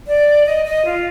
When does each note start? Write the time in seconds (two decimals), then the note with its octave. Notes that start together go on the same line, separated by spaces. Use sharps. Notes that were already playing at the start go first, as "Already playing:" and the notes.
0.07 D5
0.46 D#5
0.65 D#5
0.85 F4